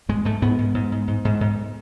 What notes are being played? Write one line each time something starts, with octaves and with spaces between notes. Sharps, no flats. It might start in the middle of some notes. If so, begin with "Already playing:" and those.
G#2 G#3
G#2 A3
G#2 B3
G#2
G#2
G#2
G#2
G#2
G#2